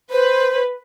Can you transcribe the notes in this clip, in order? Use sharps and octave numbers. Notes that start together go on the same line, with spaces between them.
B4 C5